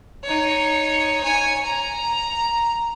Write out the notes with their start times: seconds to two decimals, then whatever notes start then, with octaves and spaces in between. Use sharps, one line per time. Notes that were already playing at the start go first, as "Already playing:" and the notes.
0.24 D#4 C#5
1.24 C#5 G#5
1.66 A#5